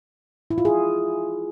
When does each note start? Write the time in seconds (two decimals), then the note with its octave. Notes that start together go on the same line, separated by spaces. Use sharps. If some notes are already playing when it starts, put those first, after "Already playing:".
0.51 E4
0.58 F4
0.65 G#4